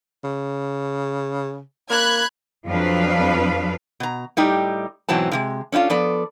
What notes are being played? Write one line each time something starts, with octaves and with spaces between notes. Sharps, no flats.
C#3
A#3 B5 F#6 G#6
F2 F3 F#3 D4 B4 F5
B2 A#5
A2 G3 D#4 G4
G#2 B2 E3 F#3 C4 A5
A2 C3 G#3
C#4 D4 E4 F4 A4
F3 B3 A4 D5